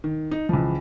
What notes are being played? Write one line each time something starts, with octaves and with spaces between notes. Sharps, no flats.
D#3
D#4
C#2 E3 F3